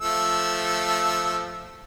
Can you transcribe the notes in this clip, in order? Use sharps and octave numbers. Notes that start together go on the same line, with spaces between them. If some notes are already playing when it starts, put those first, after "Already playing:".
F3 A3 E6